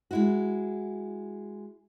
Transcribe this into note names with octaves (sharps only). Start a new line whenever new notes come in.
G#3 E4 F#4